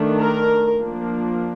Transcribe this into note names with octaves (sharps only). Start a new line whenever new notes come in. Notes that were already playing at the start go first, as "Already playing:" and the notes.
Already playing: D#3 A3 D4
A#4
F3 A#3 D4